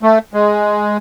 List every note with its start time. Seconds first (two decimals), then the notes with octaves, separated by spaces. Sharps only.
0.03 A3
0.34 G#3